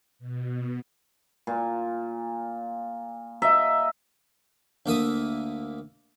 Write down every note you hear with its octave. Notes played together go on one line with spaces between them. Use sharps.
B2
A#2
D#5 E5 A#5
D2 A#3 E5 D#6